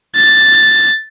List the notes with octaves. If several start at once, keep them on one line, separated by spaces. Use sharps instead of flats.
A6